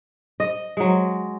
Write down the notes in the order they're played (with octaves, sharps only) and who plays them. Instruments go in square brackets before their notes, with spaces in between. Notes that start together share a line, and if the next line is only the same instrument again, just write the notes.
[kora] D#5
F#3 G#3